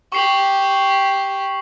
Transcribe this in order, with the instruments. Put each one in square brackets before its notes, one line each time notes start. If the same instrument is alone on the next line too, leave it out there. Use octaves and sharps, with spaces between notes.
[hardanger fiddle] G4 [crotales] C#6 C7 F#7